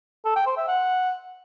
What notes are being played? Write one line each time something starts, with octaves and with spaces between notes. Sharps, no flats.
A4
G5
C5
E5
F#5